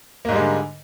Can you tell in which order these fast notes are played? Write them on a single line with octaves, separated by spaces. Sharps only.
A#3 G#2 G3 G#3 D3